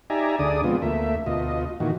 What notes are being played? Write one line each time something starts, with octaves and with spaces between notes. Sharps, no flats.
D#4 G4 D5 E5 G#5 A#5
D2 D3 D4 G#4 D5 D#6
B2 F3 G#3 B3 C4 F4
D2 A3 A#3 E5
D2 B2 F4 D#5
A#2 D#3 E3 F#4